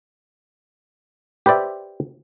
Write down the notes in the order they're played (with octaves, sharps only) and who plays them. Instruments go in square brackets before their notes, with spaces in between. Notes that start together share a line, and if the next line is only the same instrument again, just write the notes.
[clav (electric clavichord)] G4 B4 C5 D5 E5